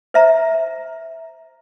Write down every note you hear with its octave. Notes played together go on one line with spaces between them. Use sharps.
C5 E5 A#5